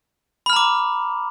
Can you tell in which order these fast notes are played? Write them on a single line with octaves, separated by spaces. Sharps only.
B5 F6 A#5 D6